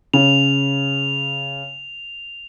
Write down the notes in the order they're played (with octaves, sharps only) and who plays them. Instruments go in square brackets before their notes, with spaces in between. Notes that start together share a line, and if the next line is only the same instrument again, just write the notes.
[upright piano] C#3 [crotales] F7